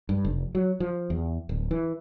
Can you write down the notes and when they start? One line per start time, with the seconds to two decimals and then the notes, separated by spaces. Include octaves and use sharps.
0.09 G2
0.25 F1
0.55 F#3
0.80 F3
1.10 E2
1.49 D1
1.71 E3